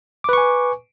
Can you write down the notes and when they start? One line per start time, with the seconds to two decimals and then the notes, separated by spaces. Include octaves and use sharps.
0.24 D6
0.29 B4
0.33 C#6
0.38 G#5